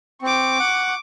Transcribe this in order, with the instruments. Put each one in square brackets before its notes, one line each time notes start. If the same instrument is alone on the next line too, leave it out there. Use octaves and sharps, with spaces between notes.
[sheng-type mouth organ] C4 [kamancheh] C#6 D6
[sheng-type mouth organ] F#5